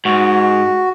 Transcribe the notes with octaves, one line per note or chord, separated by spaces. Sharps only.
G#2 F#4